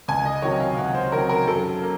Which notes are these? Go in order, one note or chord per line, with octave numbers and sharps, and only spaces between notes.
C#2 G#5
D#5
C3 D#3 F#3 C#5
F5
C#2 F#5
C5
C3 D#3 F#3 A#4
A#4
F#2 A4
A#3